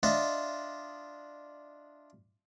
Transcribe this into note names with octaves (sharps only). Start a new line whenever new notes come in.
D4 F4 D#5 E5